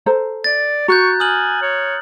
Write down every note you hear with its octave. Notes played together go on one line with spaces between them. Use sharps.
A4 C5 A#5
D5 A6
F#4 A#5 C#6 F#6 G6
G#5 D#6 F6 F#7
C#5